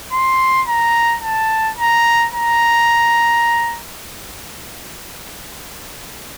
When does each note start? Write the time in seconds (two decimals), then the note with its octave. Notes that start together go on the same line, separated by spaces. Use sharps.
0.13 C6
0.68 A#5
1.23 A5
1.78 A#5
2.32 A#5